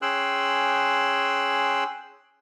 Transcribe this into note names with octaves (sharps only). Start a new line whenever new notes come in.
C#4 G#4 G5 C6 E6 F#6